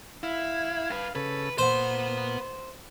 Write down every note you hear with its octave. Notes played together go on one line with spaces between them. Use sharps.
E4 F5
G2 B4
C#3 A4 B4
A#2 B4 C5 F#5